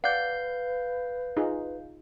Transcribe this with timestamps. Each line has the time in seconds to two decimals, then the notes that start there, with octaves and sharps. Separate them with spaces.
0.04 B4 D5 F5 F#5 G6
1.37 D#4 F4 G#4